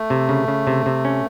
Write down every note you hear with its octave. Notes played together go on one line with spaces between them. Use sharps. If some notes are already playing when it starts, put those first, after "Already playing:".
Already playing: A3
C3
C#3
C#3
C3
C3
C#4